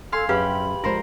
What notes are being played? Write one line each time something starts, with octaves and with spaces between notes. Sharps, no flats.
A4 F5 G#5 C6
F#2 G4 G#4 B4 F5 B5
F3 G#3 A#4 C5